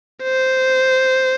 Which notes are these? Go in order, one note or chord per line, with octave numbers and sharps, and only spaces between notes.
C5